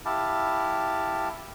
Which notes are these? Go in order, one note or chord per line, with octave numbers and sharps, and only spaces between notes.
E4 G4 F5 A5